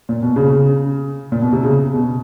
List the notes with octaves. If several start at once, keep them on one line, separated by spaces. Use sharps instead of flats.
A#2
B2
C#3
C#3
A#2
B2
C3
C#3
B2